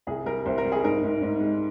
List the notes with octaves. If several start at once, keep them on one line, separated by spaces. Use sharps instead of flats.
C2 G#4
G3 A#4
C2 C5
A#4
G3
G#4
G#2 A#4
G#2
G#2
G#3